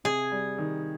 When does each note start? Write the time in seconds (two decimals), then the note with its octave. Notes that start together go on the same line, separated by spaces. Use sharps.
0.04 C3 G#4
0.31 G3
0.58 D#3